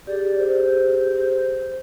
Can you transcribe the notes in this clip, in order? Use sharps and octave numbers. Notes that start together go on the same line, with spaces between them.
G4 G#4 D5
C5